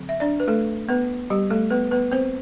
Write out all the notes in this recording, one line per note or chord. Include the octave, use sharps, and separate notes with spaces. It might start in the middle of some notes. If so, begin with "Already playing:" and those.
Already playing: D3 F#3 C4
E5
D4 D5
B4
A3 A4
B3 B4
G3 G4
A3 A4
B3 B4
B3 B4
C4 C5